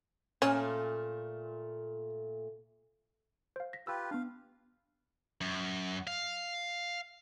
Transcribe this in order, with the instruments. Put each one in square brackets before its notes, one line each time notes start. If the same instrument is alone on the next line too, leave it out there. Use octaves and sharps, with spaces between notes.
[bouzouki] A#2 A3 F5 [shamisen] C#4
[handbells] C5 F5
A#6 B6
[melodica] F4 G4 B4 [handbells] G5 E6
[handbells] B3 D4 [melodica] F5
[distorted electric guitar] F#2
F5